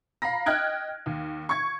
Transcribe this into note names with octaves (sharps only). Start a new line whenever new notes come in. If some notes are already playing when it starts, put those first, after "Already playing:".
F5 A#5 B5 A#6
D#5 G5 F6 F#6 G#6 D7
D#2
C#6 G#6